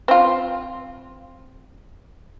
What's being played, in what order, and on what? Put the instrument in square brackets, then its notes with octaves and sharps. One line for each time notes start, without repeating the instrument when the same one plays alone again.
[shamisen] C4 F4